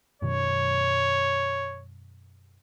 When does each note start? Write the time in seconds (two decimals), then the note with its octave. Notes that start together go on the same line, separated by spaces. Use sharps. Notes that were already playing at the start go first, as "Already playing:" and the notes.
0.22 F#2 B2 D#3 C#5